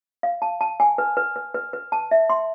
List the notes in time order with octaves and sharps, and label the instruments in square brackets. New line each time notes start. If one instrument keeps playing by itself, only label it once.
[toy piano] F5
A5
A5
G#5
B4
B4
B4
B4
B4
A5
E5
C6